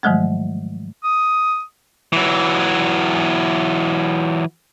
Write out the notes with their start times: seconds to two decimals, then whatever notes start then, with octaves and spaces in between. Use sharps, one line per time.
0.03 G#2 D#3 F3 F#3 G#3 A3
1.04 D#6
2.13 E3 F#3